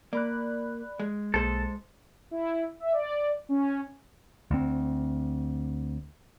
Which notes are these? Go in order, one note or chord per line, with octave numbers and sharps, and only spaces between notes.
A#3 D5 B5 F#6
G#3
B1 G#3 A#3 G#4 A4 C5
E4
E5
D5
C#4
D2 C4